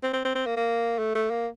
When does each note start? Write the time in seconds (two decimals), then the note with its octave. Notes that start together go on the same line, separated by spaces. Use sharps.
0.03 C4
0.13 C4
0.25 C4
0.35 C4
0.46 A#3
0.57 A#3
0.98 A3
1.15 A3
1.30 A#3